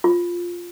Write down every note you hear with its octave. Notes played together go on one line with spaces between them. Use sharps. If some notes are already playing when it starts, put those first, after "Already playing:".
F4